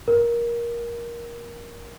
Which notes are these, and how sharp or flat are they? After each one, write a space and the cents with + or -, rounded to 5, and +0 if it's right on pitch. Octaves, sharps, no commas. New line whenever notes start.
A#4 +15